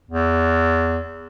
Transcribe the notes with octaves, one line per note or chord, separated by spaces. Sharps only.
E2